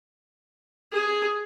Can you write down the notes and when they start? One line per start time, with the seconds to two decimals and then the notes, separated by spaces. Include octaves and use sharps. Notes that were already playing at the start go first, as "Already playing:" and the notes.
0.92 G#4